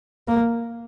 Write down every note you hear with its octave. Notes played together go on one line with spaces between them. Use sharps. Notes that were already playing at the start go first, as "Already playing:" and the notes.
A#3